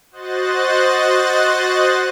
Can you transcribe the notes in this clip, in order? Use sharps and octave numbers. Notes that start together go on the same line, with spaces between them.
F#4 C5 D#5 F#6 A6